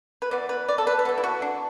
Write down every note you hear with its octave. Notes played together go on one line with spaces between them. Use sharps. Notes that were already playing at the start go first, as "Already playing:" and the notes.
B4
E3 B3 D5
B4
D5
A4
B4
B4
E3 B3 A4
E4
F#4
D4